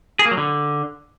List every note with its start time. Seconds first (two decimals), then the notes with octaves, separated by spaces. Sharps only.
0.19 G#4
0.25 A#3
0.31 F#3
0.37 D3